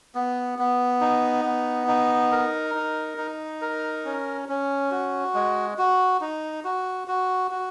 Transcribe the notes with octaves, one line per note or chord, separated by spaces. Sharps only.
B3
B3
D#4
B3
D#4
A#4
D#4
D#4
A#4
C#4
C#4
F#4
G#3
F#4
D#4
F#4
F#4
F#4